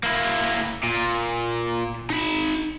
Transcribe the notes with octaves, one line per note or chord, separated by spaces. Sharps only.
A#3 E4
A#2
D#4 B5